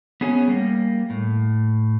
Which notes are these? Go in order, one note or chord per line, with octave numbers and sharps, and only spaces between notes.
B3 C#4 G#4 C#5
G3 A#3
A2